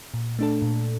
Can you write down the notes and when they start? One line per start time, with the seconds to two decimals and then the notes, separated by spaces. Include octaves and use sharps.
0.14 A#2
0.39 A3 D4 A4
0.62 A#2